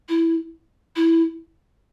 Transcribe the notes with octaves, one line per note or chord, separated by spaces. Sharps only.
E4
E4